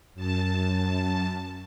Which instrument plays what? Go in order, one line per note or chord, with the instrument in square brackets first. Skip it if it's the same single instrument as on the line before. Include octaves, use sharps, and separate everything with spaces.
[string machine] F#2 A5